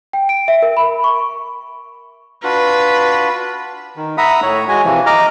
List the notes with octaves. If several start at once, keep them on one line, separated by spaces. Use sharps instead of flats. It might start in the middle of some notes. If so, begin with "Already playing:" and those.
G5
D7
E5
A#4
B5
C#6
D4 F4 F#4 B4
D#3
E5 F#5 A#5 B5 D#6
A2 C#5
G#3 F#4 G#5
C3 E3 F3
D#5 A#5 D6 F6